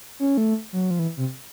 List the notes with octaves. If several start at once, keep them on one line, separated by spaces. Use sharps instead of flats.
C#4
A3
F#3
F3
E3
C3